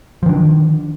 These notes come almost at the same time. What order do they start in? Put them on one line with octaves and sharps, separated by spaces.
F3 D#3 D4